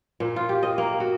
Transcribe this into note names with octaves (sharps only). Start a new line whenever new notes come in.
A#2
F4
G4
D#5
A#3
F#4